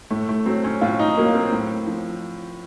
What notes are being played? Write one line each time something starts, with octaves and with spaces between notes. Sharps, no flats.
A2 A3
A3
F#3 C4
C#4
A2 F4
D#4
F#3 A#3
C4
A2
F3